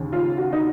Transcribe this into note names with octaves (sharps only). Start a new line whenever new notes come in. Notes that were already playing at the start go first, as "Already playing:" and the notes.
Already playing: D#2 C#3
F4
F#4
D#4